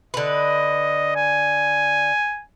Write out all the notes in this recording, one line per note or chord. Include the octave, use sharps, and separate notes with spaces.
D3 B4 D#5
G#5